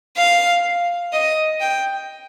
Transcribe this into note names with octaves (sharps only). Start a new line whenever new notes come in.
F5
D#5
G5